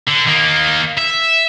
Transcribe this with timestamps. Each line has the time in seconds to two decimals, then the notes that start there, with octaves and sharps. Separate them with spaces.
0.07 D3
0.27 D#3 A#3
0.98 E5